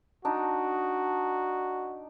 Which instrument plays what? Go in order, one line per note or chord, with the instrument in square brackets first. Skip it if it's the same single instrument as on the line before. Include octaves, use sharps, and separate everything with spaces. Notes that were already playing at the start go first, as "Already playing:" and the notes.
[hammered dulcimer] D4 D#4 [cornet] F#4